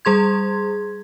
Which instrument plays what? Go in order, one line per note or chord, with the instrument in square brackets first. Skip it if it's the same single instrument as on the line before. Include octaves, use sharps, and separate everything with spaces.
[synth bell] G3 G#4 C6 G#6